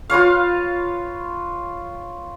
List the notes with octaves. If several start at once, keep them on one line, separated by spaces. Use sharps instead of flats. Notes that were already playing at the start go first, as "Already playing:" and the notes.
F4 B4 C#5 F5